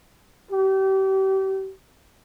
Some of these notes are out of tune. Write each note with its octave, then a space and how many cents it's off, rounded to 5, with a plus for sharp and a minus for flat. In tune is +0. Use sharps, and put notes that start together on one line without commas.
G4 -35